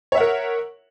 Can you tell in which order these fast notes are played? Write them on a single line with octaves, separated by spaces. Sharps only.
C#5 E5 F#5 A#4